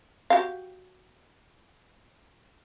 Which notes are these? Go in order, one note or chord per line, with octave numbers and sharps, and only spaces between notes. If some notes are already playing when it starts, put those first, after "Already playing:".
F#4 G4 F5